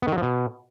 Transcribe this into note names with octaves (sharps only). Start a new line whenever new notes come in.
B3
D#3
F#3
F3
B2